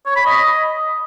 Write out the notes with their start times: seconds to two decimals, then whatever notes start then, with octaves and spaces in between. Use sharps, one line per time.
0.06 C#5
0.16 B5
0.26 D#5